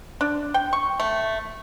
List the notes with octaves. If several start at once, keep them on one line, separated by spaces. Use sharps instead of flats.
D4
G5
C#6
A3